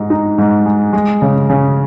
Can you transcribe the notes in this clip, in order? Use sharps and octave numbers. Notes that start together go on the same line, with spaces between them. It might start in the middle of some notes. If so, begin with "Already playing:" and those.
Already playing: G#2 G#3
D#4
G#2
G#3
G#3
C#3
C#3